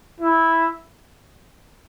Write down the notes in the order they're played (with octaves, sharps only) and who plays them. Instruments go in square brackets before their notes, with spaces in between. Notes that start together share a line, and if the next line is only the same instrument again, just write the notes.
[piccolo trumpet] E4